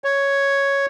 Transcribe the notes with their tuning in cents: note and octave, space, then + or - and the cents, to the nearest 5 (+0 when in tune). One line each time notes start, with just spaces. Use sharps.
C#5 +0